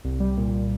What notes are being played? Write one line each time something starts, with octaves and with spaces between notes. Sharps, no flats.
C2
G3
A#2